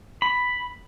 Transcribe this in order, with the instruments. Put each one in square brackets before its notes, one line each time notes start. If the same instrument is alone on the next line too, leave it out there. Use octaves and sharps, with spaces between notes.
[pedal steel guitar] B5